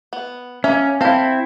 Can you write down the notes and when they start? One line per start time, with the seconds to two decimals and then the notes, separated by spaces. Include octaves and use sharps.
0.13 B3
0.64 A#3 C#4 E5
1.01 C4 E4 A4 F5